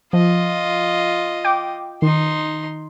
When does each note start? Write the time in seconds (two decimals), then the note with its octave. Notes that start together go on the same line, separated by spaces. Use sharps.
0.13 F3 F4 D#5
1.45 G5 D6
2.02 D#3 D#4 C6